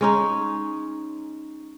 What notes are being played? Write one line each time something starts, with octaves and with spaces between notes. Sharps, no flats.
G#3 C#4 D#4